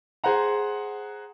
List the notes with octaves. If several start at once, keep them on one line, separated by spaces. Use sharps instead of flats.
G#4 C5 F#5 A#5